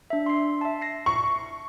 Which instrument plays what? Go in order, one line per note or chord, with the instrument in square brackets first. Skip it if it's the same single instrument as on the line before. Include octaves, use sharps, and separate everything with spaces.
[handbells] D4 E5
C6 C7
E5 A5
A#6 C7
[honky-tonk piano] C#6